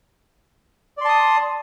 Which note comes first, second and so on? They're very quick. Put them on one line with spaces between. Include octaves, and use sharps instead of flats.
D5 C6 A5 D#6